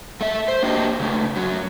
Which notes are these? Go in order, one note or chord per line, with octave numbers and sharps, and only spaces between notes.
A3 E5
C5
A#3 D4 F#4 G4 C5 D#5
C#3 A3
F#2 F#3